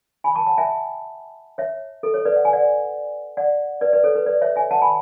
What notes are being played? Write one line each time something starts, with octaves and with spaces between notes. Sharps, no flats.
G#5 B5
A5 C#6
F#5 A5
E5 G#5
C#5 E5
A4
A4 C#5
B4 D5
F#5
G#5
D5 F#5
D5 F#5
B4 D5
B4 D5
A4 C#5
B4
B4 D5
C#5 E5
E5 G#5
F#5 A5
G#5 B5